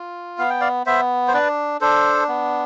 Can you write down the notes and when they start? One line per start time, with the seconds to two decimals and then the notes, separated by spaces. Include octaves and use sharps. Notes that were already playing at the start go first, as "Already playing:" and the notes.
Already playing: F4
0.38 B3 F5
0.50 G5
0.61 D5 F5
0.86 B3 C5 E5
1.28 C5
1.33 D4 B4 D5
1.81 D4 A4 C5
2.29 B3